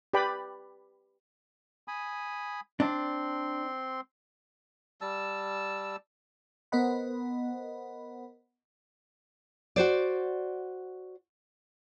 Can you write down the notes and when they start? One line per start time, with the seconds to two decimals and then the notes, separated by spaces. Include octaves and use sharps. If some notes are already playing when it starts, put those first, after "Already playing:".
0.13 G4 B4 D5 G5 B5
1.88 G#5 B5 D#6
2.80 C4 D4 C6
5.01 G3 A5 E6
6.72 B3 A#4 C5 D#5 F#5 B5
9.76 F#4 C5 D5